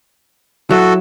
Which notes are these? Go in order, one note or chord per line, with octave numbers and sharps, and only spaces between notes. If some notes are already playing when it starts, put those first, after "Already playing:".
F#3 E4 F#4 A4